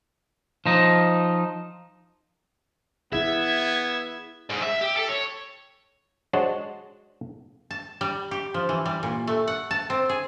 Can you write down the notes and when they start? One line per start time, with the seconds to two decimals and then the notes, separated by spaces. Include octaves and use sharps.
0.66 F3 D#4
3.12 B3 E4 G#4 E5 G#6
4.50 G#2
4.63 E5
4.81 G4
4.96 A4
5.08 C#5
6.33 G#3 D4 F#4 C5 C#5 F#5
7.71 A5
8.01 G3
8.31 G4
8.54 F3
8.69 E3
8.86 G3
9.03 A#2
9.27 A3
9.47 F#5
9.71 A5
9.90 C4
10.09 G#4